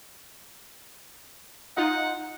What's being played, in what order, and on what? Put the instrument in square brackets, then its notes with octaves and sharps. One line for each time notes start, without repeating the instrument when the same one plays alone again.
[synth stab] D#4 F4 [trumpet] F#5